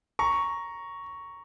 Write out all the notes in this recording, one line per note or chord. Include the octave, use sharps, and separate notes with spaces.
A#5 C#6